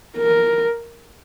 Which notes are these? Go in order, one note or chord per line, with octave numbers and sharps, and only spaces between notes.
A#4